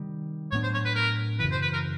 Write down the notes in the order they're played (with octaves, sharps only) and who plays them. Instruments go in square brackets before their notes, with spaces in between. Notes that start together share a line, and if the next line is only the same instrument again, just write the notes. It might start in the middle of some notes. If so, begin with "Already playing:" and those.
Already playing: [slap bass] C3 D#3 G3
[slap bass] A2 F#3 B3 D4 [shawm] C#5
[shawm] C5
C#5
B4
A#4
[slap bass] F#2 C#3 E3 [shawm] B4
[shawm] C5
B4
A#4